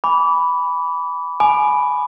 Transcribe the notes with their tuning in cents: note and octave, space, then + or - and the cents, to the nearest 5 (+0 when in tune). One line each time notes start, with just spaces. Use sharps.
G#5 -15 B5 +0 D6 -30
G#5 +15 B5 +0 D6 +45